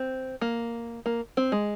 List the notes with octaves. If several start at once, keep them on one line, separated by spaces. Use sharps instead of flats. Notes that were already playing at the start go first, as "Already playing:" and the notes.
Already playing: C4
A#3
A#3
C4
G#3